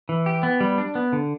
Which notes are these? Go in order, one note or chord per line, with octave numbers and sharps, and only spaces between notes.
E3
G4
B3
G3
D4
B3
D3